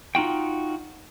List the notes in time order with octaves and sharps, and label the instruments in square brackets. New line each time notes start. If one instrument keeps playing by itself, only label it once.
[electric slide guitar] D#4 F4 F#4 G5